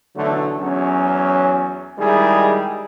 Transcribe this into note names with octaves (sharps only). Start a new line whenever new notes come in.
B1 D3 E3 F#3 A3
E2 F#3 C#4
D#3 G3 G#3 E4 G#4